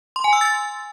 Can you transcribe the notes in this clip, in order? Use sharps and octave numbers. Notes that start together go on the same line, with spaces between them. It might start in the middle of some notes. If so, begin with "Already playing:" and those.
C6
G#5
E6
A6